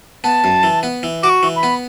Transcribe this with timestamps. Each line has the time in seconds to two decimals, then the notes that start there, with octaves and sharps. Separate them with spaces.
0.24 B3 A5
0.44 F#2
0.63 E3
0.83 B3
1.03 E3
1.23 F#4 D6
1.30 C#6
1.43 E3
1.56 B5
1.63 B3